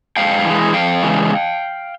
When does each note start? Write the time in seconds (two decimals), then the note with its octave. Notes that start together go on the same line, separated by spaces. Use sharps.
0.17 G#2 F5 G5
0.45 E3
0.50 G#3
0.73 F2 F5 G5
1.03 C#3 E3 G#3